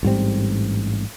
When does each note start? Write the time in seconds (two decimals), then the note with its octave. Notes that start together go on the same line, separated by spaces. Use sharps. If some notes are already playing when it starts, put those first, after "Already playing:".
0.03 A1 G#2 G3 C4